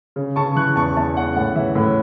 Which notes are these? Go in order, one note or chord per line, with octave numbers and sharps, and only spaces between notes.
C#3
C#3 A5 C#6
E3 C#6 F#6
E2 A5 C#6
E2 E5 A5
C#3 F#5
A2 F#5
E3 E5
A2 F#5